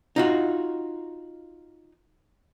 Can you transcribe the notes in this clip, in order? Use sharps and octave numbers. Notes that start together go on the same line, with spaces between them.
D#4 F4 F#4